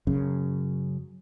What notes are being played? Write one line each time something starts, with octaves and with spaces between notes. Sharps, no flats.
F#2 C#3